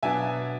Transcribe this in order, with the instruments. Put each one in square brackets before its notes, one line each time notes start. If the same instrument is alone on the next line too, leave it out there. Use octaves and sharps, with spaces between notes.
[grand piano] B2 F#3 B3 D4 E5 G#5